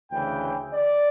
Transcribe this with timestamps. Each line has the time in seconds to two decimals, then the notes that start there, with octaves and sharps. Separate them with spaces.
0.11 D2 C#3 E3 G5
0.74 D5